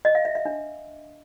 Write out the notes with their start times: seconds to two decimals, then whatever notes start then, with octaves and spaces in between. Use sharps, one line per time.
0.05 D#5
0.15 F5
0.25 E5
0.35 E5
0.45 D4